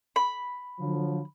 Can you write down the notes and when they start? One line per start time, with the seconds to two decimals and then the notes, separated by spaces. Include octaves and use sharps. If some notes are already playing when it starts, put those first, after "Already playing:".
0.16 B5
0.80 D3 F3 F#3